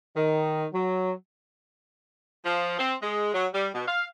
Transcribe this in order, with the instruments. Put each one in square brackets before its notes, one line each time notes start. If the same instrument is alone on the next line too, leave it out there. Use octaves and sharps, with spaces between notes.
[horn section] D#3
F#3
[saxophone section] F3
C4
G#3
F#3
G3
B2
F5